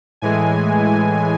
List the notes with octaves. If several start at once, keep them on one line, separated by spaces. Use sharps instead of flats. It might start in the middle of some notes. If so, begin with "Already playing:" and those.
A2 E3 G#3 G#5